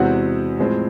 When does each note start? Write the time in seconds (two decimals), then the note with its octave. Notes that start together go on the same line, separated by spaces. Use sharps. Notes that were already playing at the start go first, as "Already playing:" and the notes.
Already playing: E2 C3 E3 G#3 C4 F#4 F#5
0.59 A2 F3 G#3 C4